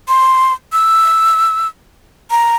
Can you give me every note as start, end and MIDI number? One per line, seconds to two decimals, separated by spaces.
0.08 0.53 84
0.73 1.68 88
2.30 2.56 82